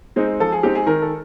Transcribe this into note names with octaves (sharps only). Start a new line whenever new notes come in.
G#3 C4 D#4
F3 A4
G#4
G#3 C4 D#4 G4
G#4
D#3 A#4
A4